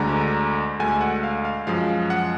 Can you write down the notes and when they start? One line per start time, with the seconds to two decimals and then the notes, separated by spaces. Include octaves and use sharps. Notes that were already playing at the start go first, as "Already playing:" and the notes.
Already playing: D2 D3 G#3 A#5
0.79 D2 D3 G#3 G#5
1.01 F#5
1.23 F5
1.45 F5
1.67 F#2 F3 G#3 F5
2.10 F#5